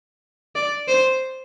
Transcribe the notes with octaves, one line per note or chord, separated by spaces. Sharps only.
D5
C5